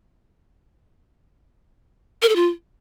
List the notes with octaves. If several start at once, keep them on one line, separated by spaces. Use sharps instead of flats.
A#4
A4
F4